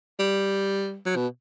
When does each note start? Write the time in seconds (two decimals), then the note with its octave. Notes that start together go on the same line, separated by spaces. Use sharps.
0.19 G3
1.06 F#3
1.16 B2